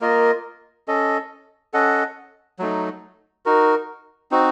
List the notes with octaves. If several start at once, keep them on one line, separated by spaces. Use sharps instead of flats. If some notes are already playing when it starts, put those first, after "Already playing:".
A#3 F4 A#4 D#5
C#4 A4 D#5
C#4 A4 D#5 F#5
F#3 A3 D#4
D#4 F#4 A#4
C4 D#4 F#4